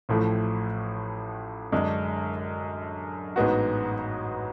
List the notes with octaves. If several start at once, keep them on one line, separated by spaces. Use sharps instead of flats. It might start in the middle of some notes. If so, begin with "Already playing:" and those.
A1 A2 F3 A3
F#2 D3 G#3 D4
A1 G#2 G#3 B3 F#4